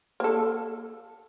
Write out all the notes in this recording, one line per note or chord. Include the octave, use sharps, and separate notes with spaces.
A#3 A4